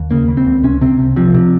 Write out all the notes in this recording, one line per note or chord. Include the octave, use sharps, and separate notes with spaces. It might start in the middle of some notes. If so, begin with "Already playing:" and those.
Already playing: D#2
C#3 A#3
C#3
C4
C#2
C3 C#4
C3 C4
C2
C3 F3
C3